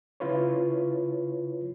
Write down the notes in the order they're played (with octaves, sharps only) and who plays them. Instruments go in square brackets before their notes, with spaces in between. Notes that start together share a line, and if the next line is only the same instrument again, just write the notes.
[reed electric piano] C#3 E4 F4 B4 C#5